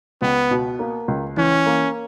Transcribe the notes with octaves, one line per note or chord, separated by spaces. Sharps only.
C#2 B3
B2
A#3
C#2
E3 C#4
A#3